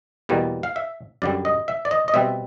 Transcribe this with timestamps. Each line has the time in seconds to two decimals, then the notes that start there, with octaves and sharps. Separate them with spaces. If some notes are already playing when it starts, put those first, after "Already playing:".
0.29 E2 B2 G3 A#3
0.63 F5
0.76 E5
1.22 F#2 D3 G3 D5
1.45 D#5
1.68 E5
1.85 D5
1.91 D#5
2.08 D#5
2.14 B2 G3 C4 E5